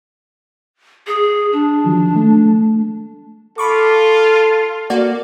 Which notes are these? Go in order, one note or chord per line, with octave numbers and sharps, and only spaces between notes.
G#4
D4
D#3 F3 F#3
A3
F4 A4 B5 C#6 D6
A#3 F#4 D5